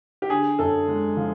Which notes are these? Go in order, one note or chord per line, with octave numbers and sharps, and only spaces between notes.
G4
D3 G#4
F#2 A4
G#3
F3